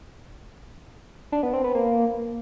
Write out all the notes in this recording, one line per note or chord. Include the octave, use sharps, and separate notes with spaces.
D4
B3
C4
B3
A#3